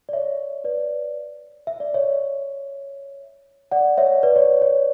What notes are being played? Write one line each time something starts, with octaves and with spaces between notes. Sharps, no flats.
D5
C#5 E5
B4 D5
E5
D5
C#5 E5
D5 F#5
C#5 E5
B4 D5
C#5
C#5